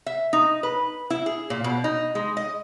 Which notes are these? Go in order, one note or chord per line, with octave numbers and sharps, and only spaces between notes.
E5
D#4
B4
E4
G#4
A#2
B2
D#4
G#3
D#5